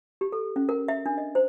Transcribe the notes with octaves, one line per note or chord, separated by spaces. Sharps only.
G4
A4
C#4
A#4
E5
D4
D#5
C5